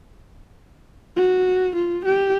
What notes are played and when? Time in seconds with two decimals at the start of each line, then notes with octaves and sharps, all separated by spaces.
1.16 F#4
1.75 F4
2.05 G4